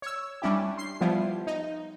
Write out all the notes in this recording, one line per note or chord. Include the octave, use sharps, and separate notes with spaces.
C#5 E6
G3 C#4 D4 E4 G4
C6 C7
F3 G3 B3 E4 F4
D#4